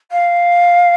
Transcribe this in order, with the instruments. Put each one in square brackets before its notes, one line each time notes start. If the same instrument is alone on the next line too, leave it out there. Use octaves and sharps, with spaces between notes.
[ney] F5